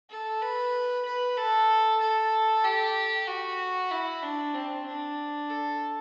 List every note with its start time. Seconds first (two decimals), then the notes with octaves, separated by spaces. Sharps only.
0.10 A4
0.42 B4
1.05 B4
1.37 A4
2.01 A4
2.64 G4
3.28 F#4
3.91 E4
4.23 D4
4.54 C4
4.86 D4
5.50 A4